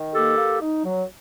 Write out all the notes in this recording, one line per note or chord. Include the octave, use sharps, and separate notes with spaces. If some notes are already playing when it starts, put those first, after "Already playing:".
Already playing: D#3
A#3 G4 A4
A#3
D#4
F#3